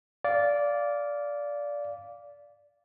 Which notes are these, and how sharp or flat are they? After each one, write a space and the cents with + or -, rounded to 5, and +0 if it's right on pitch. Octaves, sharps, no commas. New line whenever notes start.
D5 -15 F5 +0